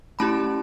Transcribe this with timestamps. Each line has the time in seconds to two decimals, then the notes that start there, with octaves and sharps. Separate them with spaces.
0.19 A3 C#4 E4 G4 A5 B5